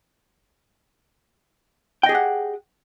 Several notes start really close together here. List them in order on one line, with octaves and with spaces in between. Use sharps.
G5 D#5 G#4 G4 F#5